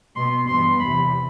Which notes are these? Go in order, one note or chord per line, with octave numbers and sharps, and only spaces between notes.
B2 B3 C6
G2 E3 B3 C6
E2 C3 E3 B5